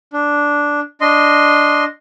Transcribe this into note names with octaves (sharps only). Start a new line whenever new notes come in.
D4
D4 D#5 C6